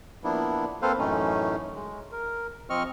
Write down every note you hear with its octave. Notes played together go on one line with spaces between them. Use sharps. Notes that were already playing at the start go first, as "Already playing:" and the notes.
F3 A#3 B3 D4 E4
A#3 C4 A4 B4 C5 F5
F#2 A2 E3 A3 C#4 D#4
G#3
A#4
F3 C4 D#5 C#6 F6